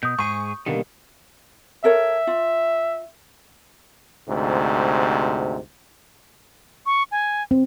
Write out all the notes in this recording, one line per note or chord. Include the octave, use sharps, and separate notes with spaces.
B2 D#6 G6
G#2 G#4 C#6
B2 D3 D#3 G3 A#3
A4 A#4 C#5 E5
F4
D2 G#2 C3
C#6
G#5
C4